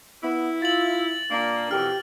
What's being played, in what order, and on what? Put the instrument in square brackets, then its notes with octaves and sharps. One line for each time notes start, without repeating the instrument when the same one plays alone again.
[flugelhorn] B3 [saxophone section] E4
[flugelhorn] F4 [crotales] A6 F#7
[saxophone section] A#2 A#3 [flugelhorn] D4
[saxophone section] F2 B2 E3 [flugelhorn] G4 [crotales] F6